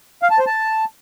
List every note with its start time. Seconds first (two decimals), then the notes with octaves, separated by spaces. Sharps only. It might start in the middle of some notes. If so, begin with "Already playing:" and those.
0.22 F5
0.31 A5
0.39 C5
0.47 A5